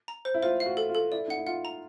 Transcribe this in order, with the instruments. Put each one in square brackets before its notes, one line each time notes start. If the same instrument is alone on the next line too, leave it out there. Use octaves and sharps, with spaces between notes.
[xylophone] A#5
C5
[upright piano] E4
[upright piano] F4 [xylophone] C5
[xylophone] F5
[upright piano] F#4
[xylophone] A4
[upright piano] F4
[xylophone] A4
[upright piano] E4 [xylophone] D5
[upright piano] D#4 [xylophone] F#5
[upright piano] E4
[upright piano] F4 [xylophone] F#5
[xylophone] A#5